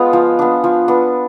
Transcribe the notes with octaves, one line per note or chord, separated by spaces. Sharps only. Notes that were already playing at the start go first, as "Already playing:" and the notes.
Already playing: G#3 B3 F4
F3
B3 D4
F3
B3 D4